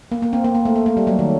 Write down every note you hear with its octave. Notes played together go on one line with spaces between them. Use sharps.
A#3
A#3
C4
A#3
A#3
A3
A#3
A3
G3
F#3
D#3